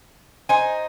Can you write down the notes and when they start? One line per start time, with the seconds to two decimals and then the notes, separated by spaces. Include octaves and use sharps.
0.49 D#4 C5 G#5